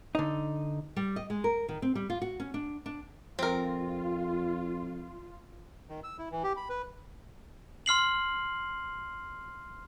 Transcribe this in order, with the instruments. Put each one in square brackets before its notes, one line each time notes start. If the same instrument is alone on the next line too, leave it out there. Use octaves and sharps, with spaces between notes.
[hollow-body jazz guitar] D3 D#4
[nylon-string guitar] G3
D#5
G#3
A#4
D#3
C4
G3
F4
F#4
C#4
D4
D4
[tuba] F2 [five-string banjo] C4 A#4 [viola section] F4
[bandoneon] D#3
E6
E4
E3
G4
B5
B4
[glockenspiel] C6 F6 C7 F#7